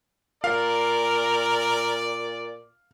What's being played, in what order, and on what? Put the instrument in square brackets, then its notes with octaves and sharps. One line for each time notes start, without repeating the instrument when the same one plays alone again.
[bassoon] A#2 [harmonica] A#4 [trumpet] D5 [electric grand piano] F5